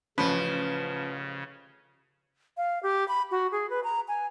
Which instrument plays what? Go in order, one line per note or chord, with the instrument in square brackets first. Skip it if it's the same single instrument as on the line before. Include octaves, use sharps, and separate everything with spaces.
[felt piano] A1 C#4 [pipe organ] C#3 [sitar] F3 [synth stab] B4
[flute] F5
G4
B5
F#4
G#4
B4
A#5
G#5